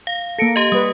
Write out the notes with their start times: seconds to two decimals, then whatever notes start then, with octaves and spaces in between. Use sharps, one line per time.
0.07 F5
0.39 A#3 A4 A#6 C#7 D7
0.56 G4 D#5
0.72 G3 B4 D#6